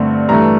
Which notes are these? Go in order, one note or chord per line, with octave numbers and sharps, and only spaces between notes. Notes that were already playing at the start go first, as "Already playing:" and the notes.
Already playing: G2 D3 A3 C4
G2 E3 A3 A#5